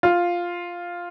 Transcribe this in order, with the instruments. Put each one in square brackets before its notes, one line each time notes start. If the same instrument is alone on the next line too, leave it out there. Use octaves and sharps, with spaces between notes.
[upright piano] F4